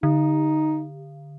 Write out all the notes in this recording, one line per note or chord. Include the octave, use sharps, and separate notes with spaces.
D3 D#4